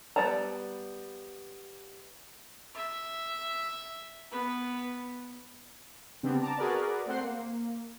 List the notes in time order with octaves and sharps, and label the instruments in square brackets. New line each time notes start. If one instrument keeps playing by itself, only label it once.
[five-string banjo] G3 B3 D5 A5 A#5
[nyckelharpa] E5
B3 B4
[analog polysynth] C#3 G3 B3 C4 D4
A5 A#5 D6
F#4 G#4 A#4 B4 D5
A3 C4 C5 F#5 C6 C7
A#3